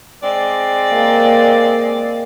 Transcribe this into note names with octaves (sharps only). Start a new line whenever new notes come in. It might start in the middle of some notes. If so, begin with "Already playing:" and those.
G#3 C4 D5
A#3 G#4